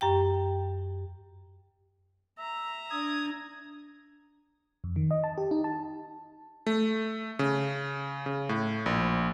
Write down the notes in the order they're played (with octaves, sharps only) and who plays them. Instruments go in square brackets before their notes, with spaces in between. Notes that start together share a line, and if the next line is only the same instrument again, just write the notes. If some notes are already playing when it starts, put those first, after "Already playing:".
[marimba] F#2 G4 G5
[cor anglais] E5 [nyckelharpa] A#5
[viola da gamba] D4 [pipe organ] D#6 G#6
[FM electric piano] F2
D#3
D#5
A5
G4
D#4
A5
[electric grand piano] A3
C#3
C#3
A2
A#1